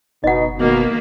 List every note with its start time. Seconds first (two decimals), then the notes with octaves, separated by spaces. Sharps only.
0.24 F#1 B2 D#4 D#5 F#5
0.58 B2 D#3 A#3